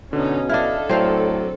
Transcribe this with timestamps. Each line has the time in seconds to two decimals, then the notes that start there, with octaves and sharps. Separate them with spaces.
0.13 B2 D3 C#4 D#4
0.49 D4 E4 A4 D#5 F5 F6
0.89 A2 F#3 C4 C5 D5 F5